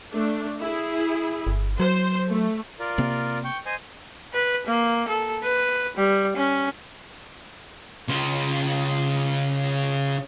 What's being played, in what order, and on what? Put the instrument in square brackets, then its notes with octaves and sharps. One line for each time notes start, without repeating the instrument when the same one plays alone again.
[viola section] A3 D4
E4 G#4
[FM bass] G1
[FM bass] F#3 [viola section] C5
[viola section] A3
[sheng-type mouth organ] F4 A#4 D5
[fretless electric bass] C3 A#3 C4
[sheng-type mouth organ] G5 C#6
C5 D#5 G#5
[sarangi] B4
A#3
A4
B4
G3
C#4
[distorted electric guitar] C#3 F4